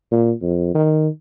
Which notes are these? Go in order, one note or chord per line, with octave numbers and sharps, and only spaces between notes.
A#2
F2
D#3